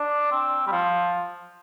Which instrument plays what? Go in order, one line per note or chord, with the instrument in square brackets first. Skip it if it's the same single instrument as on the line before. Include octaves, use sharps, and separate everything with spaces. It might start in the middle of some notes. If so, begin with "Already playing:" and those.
Already playing: [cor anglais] D4
C4
G3
F3